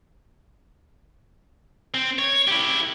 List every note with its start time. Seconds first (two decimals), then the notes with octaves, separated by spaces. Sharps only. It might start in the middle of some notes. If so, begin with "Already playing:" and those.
1.94 C4
2.18 C#5
2.47 E4 G4